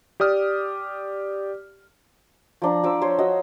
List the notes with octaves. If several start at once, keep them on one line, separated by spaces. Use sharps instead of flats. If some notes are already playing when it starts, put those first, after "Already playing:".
G4 D5 D#6 F6
F3 D4 A#5
F3 D6 E6
C5 C#5
F#4 D#5 E6